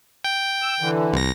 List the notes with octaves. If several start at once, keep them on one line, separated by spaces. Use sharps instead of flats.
G5
E6
D3 E3
C2 A#6